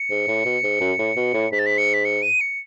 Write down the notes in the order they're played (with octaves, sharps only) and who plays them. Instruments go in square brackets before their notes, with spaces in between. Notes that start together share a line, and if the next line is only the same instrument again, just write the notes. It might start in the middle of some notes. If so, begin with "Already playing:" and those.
Already playing: [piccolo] C#7
[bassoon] G#2
A2
B2
G#2
F#2
A2
B2
A2
[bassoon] G#2 [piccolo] B6
[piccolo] A6
B6
C#7
B6
C#7
D#7
C#7